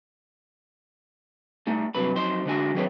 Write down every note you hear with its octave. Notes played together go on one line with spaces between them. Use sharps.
G3 A3 D#4
G2 C3 F#3 B4 B5
F2 F#3 D#4 C5 C6
D3 G#3 D4 F#4 G#5
D#3 F#3 C4 G#4 B4 C#5